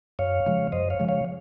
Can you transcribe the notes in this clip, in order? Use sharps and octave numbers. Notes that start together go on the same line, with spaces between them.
F#2 C#5 F5
C#3 F3 G#3
F#2 C5 D#5
C#5 F5
C#3 F3 G#3
C#5 F5